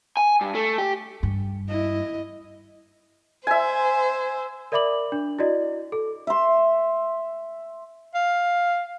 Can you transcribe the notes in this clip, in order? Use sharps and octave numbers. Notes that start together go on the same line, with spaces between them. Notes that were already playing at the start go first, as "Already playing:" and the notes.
G#5
G2
A3
G4
G2
E4 D#5
C5 E5 G#5
A#4 D5 E5 B5 D6 F#7
D4
E4 F#4 D5 D#5
A4
E5 C6
F5